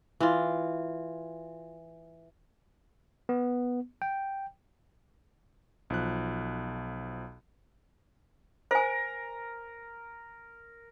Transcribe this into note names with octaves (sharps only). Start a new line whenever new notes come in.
E3 F4
B3
G5
B1 F3 F#6
A#4 C5 G#5